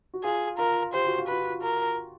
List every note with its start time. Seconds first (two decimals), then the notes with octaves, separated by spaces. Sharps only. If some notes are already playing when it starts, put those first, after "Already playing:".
0.14 F#4
0.24 F4 G#4
0.58 F4 A#4
0.93 G4 C5
1.07 F#4
1.19 F4
1.28 F#4 B4
1.62 A#4